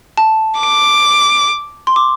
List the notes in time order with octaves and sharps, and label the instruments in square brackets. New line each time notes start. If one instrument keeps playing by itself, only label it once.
[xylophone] A5
[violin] D6
[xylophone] C6
D6